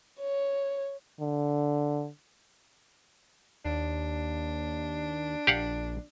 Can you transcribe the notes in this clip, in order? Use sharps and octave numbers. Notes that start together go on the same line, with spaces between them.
C#5
D3
D#2 D4
A#1 G4 F5 F#5